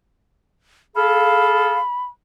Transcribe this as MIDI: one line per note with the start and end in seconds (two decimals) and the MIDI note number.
0.96 1.80 68
0.96 1.80 69
0.96 1.80 77
0.96 2.04 83